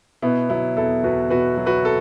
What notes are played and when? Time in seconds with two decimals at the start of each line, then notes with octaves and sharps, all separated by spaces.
0.22 B2 B3 E4
0.49 F#3 B3 E4
0.77 E2 E4 A4
1.04 E2 F#4 B4
1.30 B2 F#4 B4
1.57 F#3
1.66 F#4 B4
1.85 A4